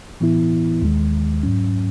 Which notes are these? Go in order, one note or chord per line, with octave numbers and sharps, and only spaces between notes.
A2 E3 B3 E4
D#2 D#3 G#3
G#2 F#3 C#4